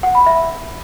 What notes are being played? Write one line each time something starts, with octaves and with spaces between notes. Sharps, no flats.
F#5
B5
E5